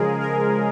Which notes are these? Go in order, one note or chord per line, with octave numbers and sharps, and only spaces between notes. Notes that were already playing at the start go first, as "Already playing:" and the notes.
Already playing: C#3 F3 G#3 G#4 A#4
A#4